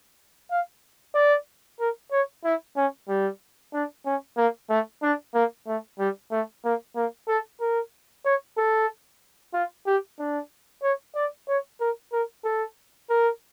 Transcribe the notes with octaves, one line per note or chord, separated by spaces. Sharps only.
F5
D5
A#4
C#5
E4
C#4
G3
D4
C#4
A#3
A3
D4
A#3
A3
G3
A3
A#3
A#3
A4
A#4
C#5
A4
F4
G4
D4
C#5
D5
C#5
A#4
A#4
A4
A#4